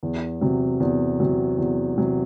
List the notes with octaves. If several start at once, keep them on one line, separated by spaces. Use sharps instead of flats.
E2
C3 F#3
E2
C3 F#3
E2
C3 F#3